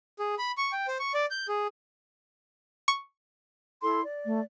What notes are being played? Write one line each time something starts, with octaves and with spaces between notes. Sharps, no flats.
G#4
B5
C#6
G5
C5
C#6
D5
G6
G#4
C#6
E4 A4 C6
D5
A3